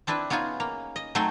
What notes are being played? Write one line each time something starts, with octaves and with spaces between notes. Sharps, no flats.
C4 D4 E4 B4
B3 C#4 D#4 F4 G#4
A#3
D#5
F#3 A3 C4 D#4 G#4 C6